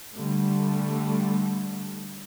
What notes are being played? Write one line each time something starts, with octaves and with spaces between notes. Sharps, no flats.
D3 G3 A3